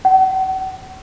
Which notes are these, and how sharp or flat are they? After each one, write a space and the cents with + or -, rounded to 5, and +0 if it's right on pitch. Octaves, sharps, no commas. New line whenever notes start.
F#5 +40